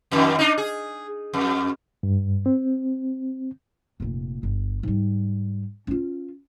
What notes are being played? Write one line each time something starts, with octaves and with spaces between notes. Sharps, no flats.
F2 D#3
D4 D#4
G#4
F2
G2
C4
F1 A#2
G1
G#2 G3
C#4 F4